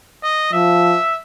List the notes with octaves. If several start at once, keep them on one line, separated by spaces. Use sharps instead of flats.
D#5
F3 E5